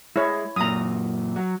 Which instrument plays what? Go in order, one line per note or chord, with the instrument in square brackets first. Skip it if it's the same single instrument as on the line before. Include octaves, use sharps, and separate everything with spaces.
[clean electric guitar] G#3 [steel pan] E4 C#5
[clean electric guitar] F#2 A#2 [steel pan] A#5 D#6
[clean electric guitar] F#3